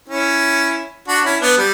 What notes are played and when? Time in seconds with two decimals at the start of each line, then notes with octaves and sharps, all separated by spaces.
0.08 C#4 E4
1.08 D4 F#4
1.24 C#4 E4
1.41 B3 D4
1.57 G3